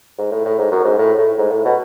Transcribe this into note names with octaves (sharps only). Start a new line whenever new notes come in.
G#2
A2
A2
G#2
F#2
G#2
A2
A2
G#2
A2
B2